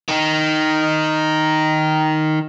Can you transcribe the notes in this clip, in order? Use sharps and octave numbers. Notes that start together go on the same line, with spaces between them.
D#3 D#4